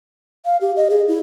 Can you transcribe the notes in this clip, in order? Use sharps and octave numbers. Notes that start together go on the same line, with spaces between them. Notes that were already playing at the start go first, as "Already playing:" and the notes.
F5
G4
D#5
G#4
E4